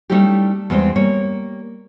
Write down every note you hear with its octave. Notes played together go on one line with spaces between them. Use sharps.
G3 A3 C#4 D#4 E4 G4
E2 G3 G#3 C4
G3 A#3 C#5